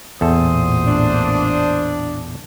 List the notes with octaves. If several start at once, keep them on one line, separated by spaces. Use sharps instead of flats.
A1 E2 A#2 A4 C5 D#6
D4